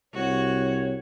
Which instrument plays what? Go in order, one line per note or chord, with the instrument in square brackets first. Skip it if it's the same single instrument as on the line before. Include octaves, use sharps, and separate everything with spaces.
[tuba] C2 [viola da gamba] F#4 [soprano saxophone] C#5